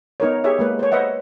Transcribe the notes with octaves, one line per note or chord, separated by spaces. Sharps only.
B3 D#4 A#4 C#5
G4 G#4 C#5 E5
G#3 A#3 B4
C5 C#5
B4 C5 D#5 E5 F#5